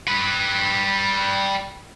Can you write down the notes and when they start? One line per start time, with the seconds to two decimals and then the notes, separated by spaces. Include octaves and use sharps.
0.08 G3 B4